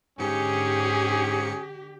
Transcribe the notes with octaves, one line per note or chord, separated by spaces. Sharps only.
G#2 D3 C#4 G4 G#4 C#7